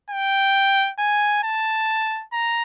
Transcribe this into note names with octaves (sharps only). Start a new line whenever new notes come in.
G5
G#5
A5
A#5